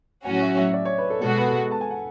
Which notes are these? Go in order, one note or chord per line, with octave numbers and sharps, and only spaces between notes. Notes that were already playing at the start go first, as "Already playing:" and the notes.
A2 F#3 C#4 F#4 G#5
E5
E5
D5
C#5
B4
A4
B2 G#3 B3 F#4 A4
B4
A4
A5
G#5
F#5